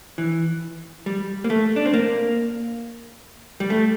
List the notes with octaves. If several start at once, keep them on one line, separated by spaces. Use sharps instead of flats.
E3
G3
A#3
A3
D4
C4
A#3
G3
A3